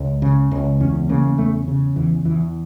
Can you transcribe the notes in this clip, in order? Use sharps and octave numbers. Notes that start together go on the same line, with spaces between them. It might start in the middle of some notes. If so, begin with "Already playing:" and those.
Already playing: C#2
C#3
C#2
E2 C#4
C#3 A#3
E2 A3
C#3
E2 E3
E2 E3